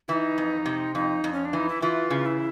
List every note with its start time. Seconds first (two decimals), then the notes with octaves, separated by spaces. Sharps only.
0.08 E3 D#4 E4
0.38 F2
0.66 C3
0.95 F2 D#4
1.24 F2
1.33 C#4
1.45 D4
1.53 E3 D#4
1.69 E4
1.82 E3 F4
2.11 C#3
2.26 E4